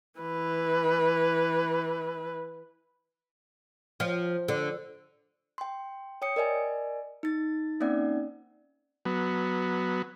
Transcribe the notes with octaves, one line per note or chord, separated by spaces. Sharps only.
E3 B4
F3
D3
G5 C6
C#5 G5 D#6 C#7
A#4 D5 D#5 G#5
D#4 A6
A#3 C4 C#4 D#4 D5 F#5
F#3 B3